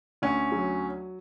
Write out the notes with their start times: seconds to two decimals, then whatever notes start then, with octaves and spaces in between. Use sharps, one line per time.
0.22 D2 C#4
0.52 F#3